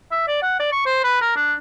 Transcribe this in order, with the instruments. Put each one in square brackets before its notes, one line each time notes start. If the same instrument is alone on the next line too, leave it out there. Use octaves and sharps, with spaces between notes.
[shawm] E5
D5
F#5
D5
C#6
C5
B4
A#4
D4